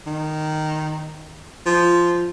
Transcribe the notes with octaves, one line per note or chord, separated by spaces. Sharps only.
D#3
F3